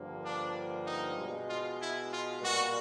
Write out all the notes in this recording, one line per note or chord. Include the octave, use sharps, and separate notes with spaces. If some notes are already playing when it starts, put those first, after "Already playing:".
Already playing: G2 D3 F3 A#3
D4
D#4
B2 G#3
F4
E4
F4
A#2 G3 A#3 F#4